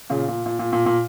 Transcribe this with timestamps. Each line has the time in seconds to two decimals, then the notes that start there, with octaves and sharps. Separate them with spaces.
0.10 A#2 C#3
0.28 A#2
0.46 A#2
0.59 A#2
0.73 A#2
0.86 A#2